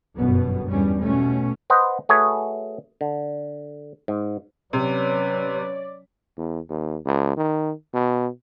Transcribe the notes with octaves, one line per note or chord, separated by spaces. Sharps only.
G1 F#2 B2 B3
E2 G2 G3 C#4
B2 A3 C#4
B4 C5 D#5 F#5
A3 F#4 G#4 B4 C#5
D3
G#2
C3 F#3 C#4 B4 C#5 D5
E2
D#2
C#2
D#3
B2